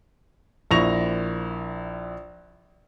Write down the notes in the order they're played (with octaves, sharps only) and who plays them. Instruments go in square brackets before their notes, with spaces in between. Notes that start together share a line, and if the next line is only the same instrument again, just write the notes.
[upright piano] A#1 E4 C#6 A#6 F7